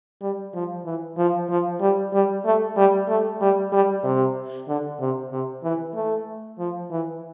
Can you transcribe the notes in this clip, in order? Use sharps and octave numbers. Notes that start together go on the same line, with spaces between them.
G3
F3
E3
F3
F3
G3
G3
A3
G3
A3
G3
G3
C3
D3
C3
C3
E3
A3
F3
E3